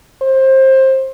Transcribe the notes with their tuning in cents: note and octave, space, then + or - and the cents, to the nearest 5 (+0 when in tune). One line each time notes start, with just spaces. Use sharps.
C5 +20